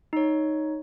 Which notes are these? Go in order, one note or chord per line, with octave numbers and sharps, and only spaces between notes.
D#4 C#5